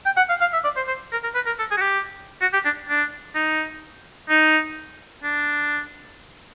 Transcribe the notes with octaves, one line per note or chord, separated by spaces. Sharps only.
G5
F#5
F5
F5
E5
D5
C5
C5
A#4
A#4
B4
A#4
A4
G#4
F#4
G4
F#4
G4
D4
D4
D#4
D#4
D4